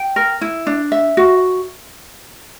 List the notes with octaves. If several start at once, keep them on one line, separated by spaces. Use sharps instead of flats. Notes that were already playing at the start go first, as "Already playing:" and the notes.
Already playing: G5
A#4
E4
D4
E5
F#4